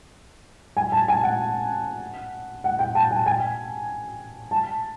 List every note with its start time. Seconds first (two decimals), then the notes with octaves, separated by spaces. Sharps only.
0.77 G#5
0.92 A5
1.08 G#5
1.23 F#5
2.64 F#5
2.79 G5
2.95 A5
3.11 G#5
3.26 G#5
4.51 A5